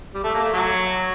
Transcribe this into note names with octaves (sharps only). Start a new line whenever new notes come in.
G3
A3
A#3
A3
F#3